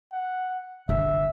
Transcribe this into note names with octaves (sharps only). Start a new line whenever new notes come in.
F#5
G1 E5